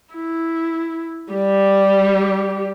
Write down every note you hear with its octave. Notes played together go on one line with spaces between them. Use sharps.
E4
G3 G4